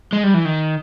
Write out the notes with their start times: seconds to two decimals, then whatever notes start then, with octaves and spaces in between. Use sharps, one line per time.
0.13 G#3
0.24 G3
0.34 E3
0.45 D#3